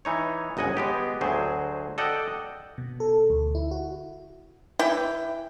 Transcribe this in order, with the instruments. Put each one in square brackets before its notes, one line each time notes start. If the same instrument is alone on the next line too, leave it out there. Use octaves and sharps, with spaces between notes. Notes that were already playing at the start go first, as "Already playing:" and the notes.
[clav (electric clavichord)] E3 D#4 C#5
G1 C#2 D#5 F#5 G#5
G#3 B3 G4
D2 F#3 G#4 C5
A4 D5 D#5 F#5 G5
[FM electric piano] B2
A4
D2
E4
F#4
[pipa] E3 E4 G5